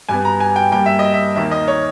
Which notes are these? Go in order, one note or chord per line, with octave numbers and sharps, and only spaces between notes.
G2 G3 B3 G#5
A#5
G#5
G5
G2 G3 A#3 G5
E5
D#5
E5
D#2 D#3 A#3 E5
D#5
C#5